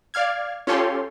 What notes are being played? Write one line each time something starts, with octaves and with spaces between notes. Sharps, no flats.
D5 F5 F6 G#6
C#4 F4 G4 A4 C#5 C6